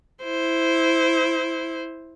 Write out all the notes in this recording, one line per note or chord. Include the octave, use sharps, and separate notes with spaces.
E4 C5